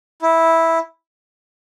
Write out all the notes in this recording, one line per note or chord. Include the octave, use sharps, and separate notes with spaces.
E4